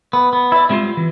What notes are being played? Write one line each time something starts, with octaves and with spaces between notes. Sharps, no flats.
B3
B3
E4 D5
G3 G#3 C4 C#4 F4
E3